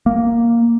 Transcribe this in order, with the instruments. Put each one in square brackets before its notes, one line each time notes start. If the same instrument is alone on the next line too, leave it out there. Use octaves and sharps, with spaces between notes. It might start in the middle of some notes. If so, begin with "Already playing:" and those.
[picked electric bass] A#3